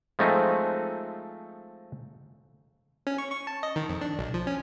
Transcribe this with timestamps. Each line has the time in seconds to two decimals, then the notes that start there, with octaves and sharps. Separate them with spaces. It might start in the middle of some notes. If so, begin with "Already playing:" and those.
0.19 F3 G#3 A3 C4 D#4
3.07 C#4
3.18 C#6
3.32 C#6
3.47 A5
3.63 D#5
3.76 D#3
3.89 F2
4.01 D4
4.19 B1
4.34 F3
4.47 C#4